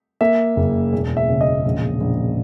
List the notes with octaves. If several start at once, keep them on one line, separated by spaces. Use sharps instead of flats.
A#3 E5
F#1
E1
E5
C#3
D#5
A#1
A#1